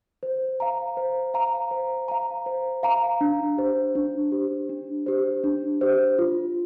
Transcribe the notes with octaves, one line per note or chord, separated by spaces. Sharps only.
C5
F5 A#5
C5
F5 A#5
C5
F5 A#5
C5
F5 A#5
D4
G4 C5
D4
G4 C5
D4
G4 C5
D4
G4 C5
F4